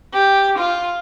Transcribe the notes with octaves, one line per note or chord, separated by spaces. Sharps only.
G4
F4